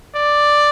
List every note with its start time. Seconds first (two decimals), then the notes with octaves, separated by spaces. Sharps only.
0.13 D5